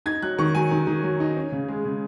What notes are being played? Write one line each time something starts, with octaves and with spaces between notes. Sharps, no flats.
D#4 G#6
F#3 F#6
D#3 C#6
F#3 G#5
D#3
D#3
F#3
D#4
C#4
C#3
G#3
C#3